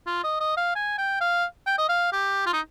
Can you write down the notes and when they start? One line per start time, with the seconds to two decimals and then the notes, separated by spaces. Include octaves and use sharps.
0.07 F4
0.24 D#5
0.41 D#5
0.57 F5
0.76 G#5
0.98 G5
1.21 F5
1.67 G5
1.78 D#5
1.89 F5
2.12 G4
2.46 F4
2.53 D#4